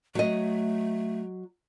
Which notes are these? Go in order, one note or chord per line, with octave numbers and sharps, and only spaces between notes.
F#3 A3 D#5